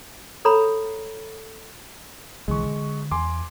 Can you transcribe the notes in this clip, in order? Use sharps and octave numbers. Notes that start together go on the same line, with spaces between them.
A4 C#5 A#5 B5
B1 D3 E3 G#3 C#6
D3
E2 G#5 C6 D6